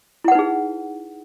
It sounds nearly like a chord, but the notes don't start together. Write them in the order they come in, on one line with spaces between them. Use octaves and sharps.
E4 F#5 B4 D#4 G#4